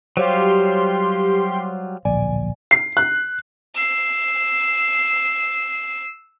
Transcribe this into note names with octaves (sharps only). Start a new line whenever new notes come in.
F#3 G3 F4 G4 C5 C#5 F5 C6
D1 A#1 D5 G#5
C7
F#6
E6 C7